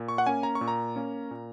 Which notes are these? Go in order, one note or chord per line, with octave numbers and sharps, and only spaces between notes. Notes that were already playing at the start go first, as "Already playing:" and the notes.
Already playing: A#2
C#6
F#5
A#3 C#4 G#5
A#5
C#6
A#2
A#5
A#3 C#4
A#2